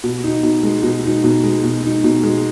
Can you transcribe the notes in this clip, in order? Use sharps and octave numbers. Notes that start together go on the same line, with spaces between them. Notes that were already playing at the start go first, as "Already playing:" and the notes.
B2
D#4
B2
G#3
B2
D#4
B2
G#3
B2
D#4
B2
G#3